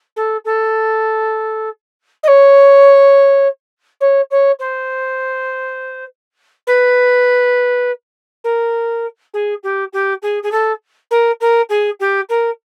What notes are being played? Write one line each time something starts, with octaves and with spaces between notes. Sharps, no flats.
A4
A4
D#5
C#5
C#5
C#5
C5
B4
A#4
G#4
G4
G4
G#4
G#4
A4
A#4
A#4
G#4
G4
A#4